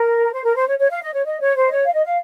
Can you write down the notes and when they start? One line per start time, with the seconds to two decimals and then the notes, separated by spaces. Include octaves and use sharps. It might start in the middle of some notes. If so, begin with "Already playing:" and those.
Already playing: A#4
0.33 C5
0.44 A#4
0.55 C5
0.68 C#5
0.79 C#5
0.90 F5
1.03 D#5
1.13 C#5
1.25 D#5
1.41 C#5
1.56 C5
1.67 D#5
1.71 C#5
1.85 F5
1.93 D#5
2.05 F5